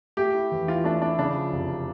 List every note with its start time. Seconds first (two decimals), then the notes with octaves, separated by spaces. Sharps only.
0.17 A3 G4
0.35 E4
0.51 E2
0.68 E3 F4
0.84 A3 D4
1.02 D4 E4
1.18 C#3 D4
1.35 F3
1.52 F1